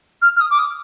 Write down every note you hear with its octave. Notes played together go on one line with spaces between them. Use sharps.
F6
F6
D#6
D6
D#6